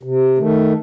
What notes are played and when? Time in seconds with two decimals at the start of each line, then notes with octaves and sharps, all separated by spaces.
0.03 C3
0.38 D#3 A3